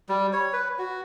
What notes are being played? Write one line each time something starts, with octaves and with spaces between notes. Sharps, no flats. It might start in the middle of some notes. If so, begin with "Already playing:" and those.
G3
C#5
B4
F#4